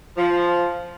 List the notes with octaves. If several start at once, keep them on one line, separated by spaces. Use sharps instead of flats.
F3